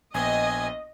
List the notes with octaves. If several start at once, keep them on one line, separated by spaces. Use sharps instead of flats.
A#1 B3 D#5 G5 G#5